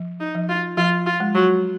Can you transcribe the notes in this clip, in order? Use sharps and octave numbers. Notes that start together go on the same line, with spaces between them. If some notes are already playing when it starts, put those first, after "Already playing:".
Already playing: F3
D#4
F3
F4
F3 F4
F4
G#3
F#3